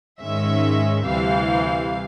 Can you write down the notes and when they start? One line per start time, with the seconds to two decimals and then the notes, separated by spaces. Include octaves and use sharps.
0.20 G#2 D#3 G#3 C#4 E5
1.05 D2 C3 E3 G3 F5